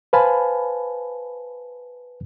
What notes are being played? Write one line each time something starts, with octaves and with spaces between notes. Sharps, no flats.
B4 C5 F5 G#5 A5 B5